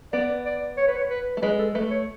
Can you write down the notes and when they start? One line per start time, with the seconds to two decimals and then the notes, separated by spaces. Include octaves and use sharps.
0.13 B3 D5
0.46 D5
0.77 C#5
0.88 B4
0.97 C#5
1.10 B4
1.37 A3
1.42 G#3 B4
1.59 A4
1.74 A3 B4
1.91 C#5